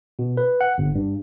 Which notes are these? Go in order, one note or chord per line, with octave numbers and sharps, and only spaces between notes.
B2
B4
F#5
G1
G2